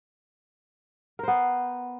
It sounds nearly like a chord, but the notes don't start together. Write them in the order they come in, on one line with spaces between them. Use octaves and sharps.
A#4 C5 B3